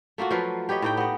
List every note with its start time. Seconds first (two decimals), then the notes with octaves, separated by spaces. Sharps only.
0.18 A3 A#3 F4 F#4
0.31 F3 F#3 F4 B4
0.69 G4 B4 C#5 D#5
0.82 A2 D#4 G5
0.97 B3 D#5